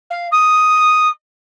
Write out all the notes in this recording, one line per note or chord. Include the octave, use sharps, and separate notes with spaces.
F5
D#6